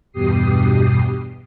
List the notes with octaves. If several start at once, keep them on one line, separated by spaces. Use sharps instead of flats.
E2 G2 B2 G4 D#6 C7